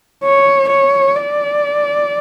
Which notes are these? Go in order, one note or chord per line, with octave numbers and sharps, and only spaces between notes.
C#5
C#5
D5